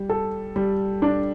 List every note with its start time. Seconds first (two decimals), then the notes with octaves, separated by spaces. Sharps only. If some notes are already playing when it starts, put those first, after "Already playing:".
Already playing: G3
0.10 A4
0.56 G3
1.02 D4